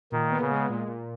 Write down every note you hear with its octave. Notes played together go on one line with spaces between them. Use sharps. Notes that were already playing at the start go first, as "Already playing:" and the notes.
A#2 D#3
B3
C#3
G#3
A#2
A#2